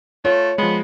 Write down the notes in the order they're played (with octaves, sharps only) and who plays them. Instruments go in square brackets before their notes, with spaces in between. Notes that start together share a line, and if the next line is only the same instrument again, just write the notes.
[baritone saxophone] A3 [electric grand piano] F4 [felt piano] C#5
[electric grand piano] F3 G#3 [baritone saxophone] B3